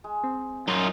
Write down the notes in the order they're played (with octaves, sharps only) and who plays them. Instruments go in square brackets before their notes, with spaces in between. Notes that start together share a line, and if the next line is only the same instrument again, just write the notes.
[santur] G#3
[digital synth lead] C4
[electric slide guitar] F#2 [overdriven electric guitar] D#4 F4 [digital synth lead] D#6